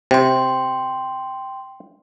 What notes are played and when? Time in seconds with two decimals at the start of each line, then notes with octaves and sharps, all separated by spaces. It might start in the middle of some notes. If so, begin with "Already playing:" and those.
0.11 C3 G5 C6